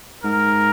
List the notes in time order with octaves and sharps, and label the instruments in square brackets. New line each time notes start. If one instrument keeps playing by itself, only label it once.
[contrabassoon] G#2 [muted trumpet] A#4